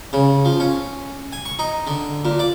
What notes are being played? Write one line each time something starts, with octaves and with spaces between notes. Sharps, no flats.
C#3
F3
C#4
G#5
C#6
D#4
D3
A#2
D5